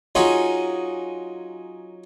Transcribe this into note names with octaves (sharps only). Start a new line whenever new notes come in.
F#3 C#4 D#4 F4 G#4